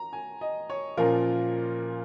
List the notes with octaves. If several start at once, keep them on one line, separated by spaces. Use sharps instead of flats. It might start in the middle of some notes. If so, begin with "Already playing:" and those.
Already playing: A#5
G#5
D#5
C#5
A#2 F3 A#3 C#4 F4 A#4